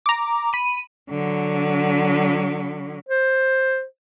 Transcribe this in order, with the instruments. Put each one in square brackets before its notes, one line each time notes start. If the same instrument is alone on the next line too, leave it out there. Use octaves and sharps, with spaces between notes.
[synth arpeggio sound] A#5 D6
B5 D#7
[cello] D3 F#3
[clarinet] C5